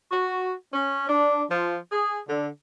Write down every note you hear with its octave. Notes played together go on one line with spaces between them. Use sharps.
F#4
C#4
D4
F3
G#4
D3